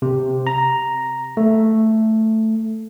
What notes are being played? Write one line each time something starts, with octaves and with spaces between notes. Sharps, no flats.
C3
A#5
A3